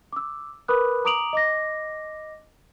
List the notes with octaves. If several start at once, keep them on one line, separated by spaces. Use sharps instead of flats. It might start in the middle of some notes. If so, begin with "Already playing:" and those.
D6 E6
A#4 B4 B5 D6 D#6 F#6
A#5 D6 D#6 D7 F7 F#7
D#5 D6 A#6